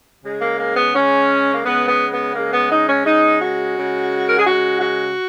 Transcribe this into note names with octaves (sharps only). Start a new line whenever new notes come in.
C#3 G#3
A#3
A#3
B3
C#3 G#3 C#4
A#3
C#3 G#3 B3
B3
B3
C#3 G#3 A#3
B3
D#4
C#4
C#3 G#3 D#4
F#4
C#3 G#3
A#4
G#4
C#3 G#3 F#4
F#4